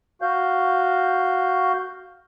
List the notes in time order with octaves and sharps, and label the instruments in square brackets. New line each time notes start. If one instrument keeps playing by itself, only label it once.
[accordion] F#4 F5 G6